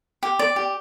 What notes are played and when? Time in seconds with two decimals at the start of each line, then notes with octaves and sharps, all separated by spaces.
0.23 G4
0.39 D5
0.56 G4